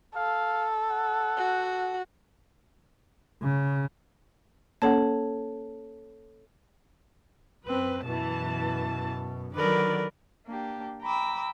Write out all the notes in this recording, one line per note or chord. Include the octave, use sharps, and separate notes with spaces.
A4 F5
F#5
F#4
C#3
A#3 C#4 A4 C#5 F#5 A5
F#2 C4 B4
F#2 B2 E3 A5
D3 D#3 F#3 A#4 B4 D5
A#3 D4 G4
G5 A#5 B5 D6 E6